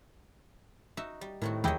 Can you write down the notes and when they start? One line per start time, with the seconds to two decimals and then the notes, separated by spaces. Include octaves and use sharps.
0.97 D#4 F#4 E5
1.21 G3
1.42 A2 D#3 C4 F#4
1.64 D#2 E3 F#3 G#3 A3 E4 G4 D#5